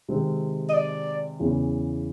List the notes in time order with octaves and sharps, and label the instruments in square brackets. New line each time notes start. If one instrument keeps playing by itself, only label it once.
[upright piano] C3 D#3 G#3 C4
[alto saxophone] D#5
D5
[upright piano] E2 C#3 E3